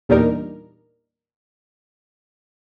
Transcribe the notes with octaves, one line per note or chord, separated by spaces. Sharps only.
E2 A#2 G3 D4 D#4 A#4